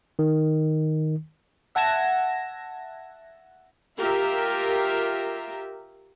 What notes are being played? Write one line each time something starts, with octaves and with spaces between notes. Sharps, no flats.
D#3
E5 F#5 A5 G#6 A#6 E7
F4 G4 A#4 E5